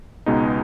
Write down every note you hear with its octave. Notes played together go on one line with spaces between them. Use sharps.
C#2 B2 G#3 B3 D#4